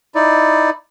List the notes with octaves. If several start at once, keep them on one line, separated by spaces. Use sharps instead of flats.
D#4 E4 D5